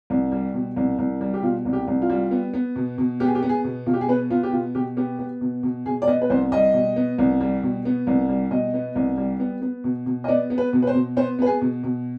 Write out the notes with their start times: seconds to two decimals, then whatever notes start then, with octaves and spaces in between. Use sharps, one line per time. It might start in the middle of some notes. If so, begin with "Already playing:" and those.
0.10 C2
0.32 G3
0.54 B2
0.76 C2
0.98 C2
1.21 G3
1.34 G4
1.42 B2 F4
1.65 C2
1.73 G4
1.87 C2
2.02 F4
2.10 G3
2.31 B3
2.53 B3
2.76 B2
2.98 B2
3.20 B3 G4
3.27 G#4
3.35 G4
3.43 B3
3.49 G#4
3.64 B2
3.86 B2 F4
3.93 G4
4.01 G#4
4.09 B3 B4
4.30 B3 F4
4.43 G4
4.53 B2 F4
4.75 B2 G4
4.97 B3 G4
5.19 B3
5.41 B2
5.63 B2
5.86 B2 G#4
6.02 D5
6.08 B3 D#5
6.22 B4
6.30 C2 C5
6.52 G3 D#5
6.74 B2
6.96 B3
7.18 C2
7.40 G3
7.63 B2
7.85 B3
8.07 C2
8.29 G3
8.51 B2 D#5
8.74 B3
8.96 C2
9.17 G3
9.40 B3
9.62 B3
9.84 B2
10.06 B2
10.24 D#5
10.28 B3 D5
10.50 B3
10.58 B4
10.73 B2
10.82 B4
10.87 C5
10.95 B2
11.17 B3 C5
11.39 B3 B4
11.46 G#4
11.61 B2
11.83 B2